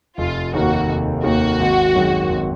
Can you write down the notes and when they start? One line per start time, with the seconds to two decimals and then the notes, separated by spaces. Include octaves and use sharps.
0.17 F1 F4
0.53 D#2 D#3 A#3 F#4
0.88 F1
1.23 D#2 D#3 A#3 F#4
1.60 G#1
1.95 F#2 D#3 G#3
2.30 G#1